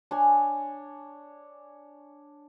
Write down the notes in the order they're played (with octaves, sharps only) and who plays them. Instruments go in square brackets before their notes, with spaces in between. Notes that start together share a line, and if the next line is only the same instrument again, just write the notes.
[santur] D4 C#5 G#5